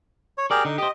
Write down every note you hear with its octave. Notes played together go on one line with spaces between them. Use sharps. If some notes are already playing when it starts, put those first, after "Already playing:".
C#5
G4 G#4 A#4 D5
D3 D#4
G4 C5 D#5